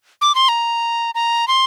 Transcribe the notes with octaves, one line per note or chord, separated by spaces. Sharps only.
D6
C6
A#5
A#5
C6